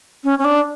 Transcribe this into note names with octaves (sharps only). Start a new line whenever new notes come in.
C#4
C#4
D4